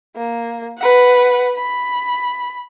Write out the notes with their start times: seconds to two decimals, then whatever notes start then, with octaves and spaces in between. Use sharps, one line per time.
0.17 A#3
0.78 B4 F#5
1.56 B5